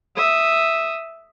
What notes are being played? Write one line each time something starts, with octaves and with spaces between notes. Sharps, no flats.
E5 D#6